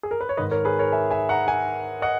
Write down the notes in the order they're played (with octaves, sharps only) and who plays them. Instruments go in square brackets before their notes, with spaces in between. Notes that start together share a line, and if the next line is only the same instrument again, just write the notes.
[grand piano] G#4
A#4
B4
C#5
G#2 D#3 B4 D#5
A#4 C#5
G#4 B4
A#4 C#5
E5 G#5
E5 G#5
F#5 A#5
E5 G#5
D#5 F#5